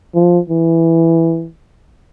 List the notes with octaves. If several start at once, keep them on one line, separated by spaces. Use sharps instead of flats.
F3
E3